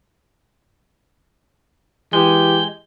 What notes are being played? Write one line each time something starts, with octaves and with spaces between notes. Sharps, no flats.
E3 G#3 G4 G6